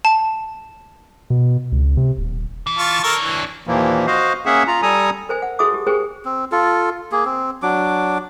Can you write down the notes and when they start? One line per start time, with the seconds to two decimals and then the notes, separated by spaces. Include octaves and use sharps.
0.05 A5
1.30 B2
1.72 C#2
1.97 C3
2.18 D#1
2.67 E3
2.78 F4 A5 C#6
3.04 D4 A4 A#4 C#5 A5
3.21 E3
3.67 D#2 A#2 E3 F3 A#3
4.07 F#4 C5 D#5 F5
4.46 A#3 C#4 G#4 E5 F#5
4.67 F4 A#5
4.82 G3 A4 G#5 A#5 D#6
5.29 A#4 C5 G#5
5.42 F#5
5.59 F#4 G#4 E5 A5 D6 D#6
5.74 G4
5.87 G4 G#4 A#4 C5 G5 G#5
6.25 C4
6.52 F4 A4
7.12 A#3 G#4
7.25 C4
7.63 F#3 D4 D6